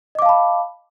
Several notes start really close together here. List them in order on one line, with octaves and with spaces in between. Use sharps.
D#5 D6 F5 A5 B5